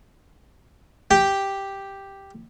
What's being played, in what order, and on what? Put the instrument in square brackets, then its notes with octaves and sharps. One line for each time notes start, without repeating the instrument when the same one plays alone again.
[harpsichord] G4 G5